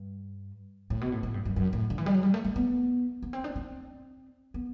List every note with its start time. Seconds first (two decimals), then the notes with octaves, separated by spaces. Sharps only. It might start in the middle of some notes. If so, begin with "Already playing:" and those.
Already playing: G2
0.90 A2
1.01 B2
1.12 A2
1.23 A2
1.34 G2
1.45 F#2
1.56 F#2
1.73 A2
1.90 D3
1.98 E3
2.06 G3
2.14 F#3
2.23 G3
2.34 A3
2.44 A3
2.56 B3
3.23 B3
3.33 C4
3.44 D4
3.56 C4
4.54 B3